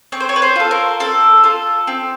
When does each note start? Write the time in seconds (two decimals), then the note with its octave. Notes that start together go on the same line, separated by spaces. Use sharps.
0.12 C4 C#5
0.20 C5
0.29 C#5
0.36 B4
0.42 C5
0.56 F4 A4
0.71 A#4
1.00 C4 A4
1.44 F4 A4
1.87 C4